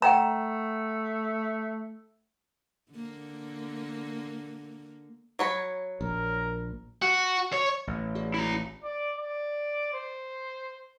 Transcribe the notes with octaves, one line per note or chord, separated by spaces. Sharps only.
A3 F#5 G5 A#5
D3 A#3
F#3 C#5 B5
A#1 A#4
F#4
C#5
A1
F#4 G#4 D5
E4 A#5
D5
D5
C5